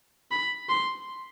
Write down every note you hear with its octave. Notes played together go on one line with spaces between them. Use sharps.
B5
C6